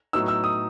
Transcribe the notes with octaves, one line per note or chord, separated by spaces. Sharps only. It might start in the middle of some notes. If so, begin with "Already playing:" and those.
A2 F#3 B3 D#4 E6
E6
D#6